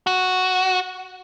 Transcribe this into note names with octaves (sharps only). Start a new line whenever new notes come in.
F#4